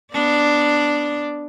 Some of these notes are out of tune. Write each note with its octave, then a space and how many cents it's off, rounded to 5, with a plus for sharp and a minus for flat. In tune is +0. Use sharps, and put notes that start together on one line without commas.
B3 +0 D4 +0 D5 +0